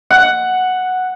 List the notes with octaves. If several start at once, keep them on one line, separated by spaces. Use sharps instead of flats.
F#5